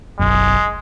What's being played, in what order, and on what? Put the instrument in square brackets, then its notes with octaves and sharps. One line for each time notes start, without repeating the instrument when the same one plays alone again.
[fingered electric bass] F#1 B1 F#2 [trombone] G#3